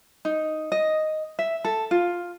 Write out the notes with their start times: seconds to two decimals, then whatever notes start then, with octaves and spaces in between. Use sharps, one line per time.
0.25 D#4
0.72 D#5
1.39 E5
1.65 A4
1.91 F4